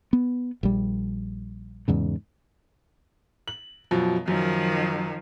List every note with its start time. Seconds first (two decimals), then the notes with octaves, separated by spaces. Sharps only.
0.13 B3
0.63 A#1 G3
1.88 E2 G#2 C#3
3.48 F#7
3.91 F#2 B2 F3
4.28 F#2 D#3 F3